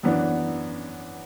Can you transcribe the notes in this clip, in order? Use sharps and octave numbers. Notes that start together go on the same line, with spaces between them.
F#2 E3 B3 D4